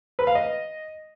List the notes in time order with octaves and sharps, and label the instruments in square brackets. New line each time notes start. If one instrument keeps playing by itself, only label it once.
[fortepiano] B4
F5
D#5